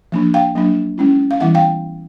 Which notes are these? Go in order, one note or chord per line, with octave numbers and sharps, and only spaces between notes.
F3 A#3 D4
F5 G5
F#3 A#3 D4
G#3 C#4 E4
F5
E3 G3 B3 E4 E5 F#5
F5 G5